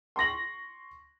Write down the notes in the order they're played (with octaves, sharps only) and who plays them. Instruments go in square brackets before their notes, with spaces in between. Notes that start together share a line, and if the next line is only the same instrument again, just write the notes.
[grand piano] C6 C#6 A#6 F#7